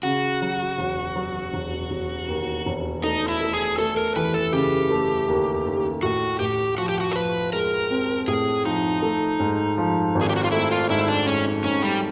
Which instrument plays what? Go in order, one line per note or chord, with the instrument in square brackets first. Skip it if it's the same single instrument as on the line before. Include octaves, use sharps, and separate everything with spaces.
[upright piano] C#3 [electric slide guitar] F#4
[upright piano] F#3
E1
F#3
E1
E1
D#2
E1
[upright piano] A3 [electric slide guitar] D#4
[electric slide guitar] E4
[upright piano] A3
[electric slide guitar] G#4
[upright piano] A3 [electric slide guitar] A4
[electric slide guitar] A#4
[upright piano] E3 [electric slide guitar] B4
[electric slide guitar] A4
[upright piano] C#3 [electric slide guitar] G4
[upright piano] A3
D#2
D#2
[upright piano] A2 [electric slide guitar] F#4
[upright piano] A2 [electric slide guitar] G4
[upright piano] F3 [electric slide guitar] F#4
[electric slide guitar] G4
F#4
A#4
[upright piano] F3 [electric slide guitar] B4
[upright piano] G#3 [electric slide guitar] A#4
[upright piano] C4
[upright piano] A2 [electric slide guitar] G#4
[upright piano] F3 [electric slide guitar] D#4
[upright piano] A3
G#2
F3
G#1
[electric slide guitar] G#4
G4
F#4
F4
[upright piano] A3 [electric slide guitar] E4
[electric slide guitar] F4
[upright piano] G#2 [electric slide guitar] E4
[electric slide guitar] D4
[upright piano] G#2 [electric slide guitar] C#4
[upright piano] G#2 [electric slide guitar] C#4
[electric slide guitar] G3